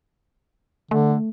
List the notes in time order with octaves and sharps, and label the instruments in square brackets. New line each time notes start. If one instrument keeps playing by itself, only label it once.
[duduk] D3 [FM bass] A3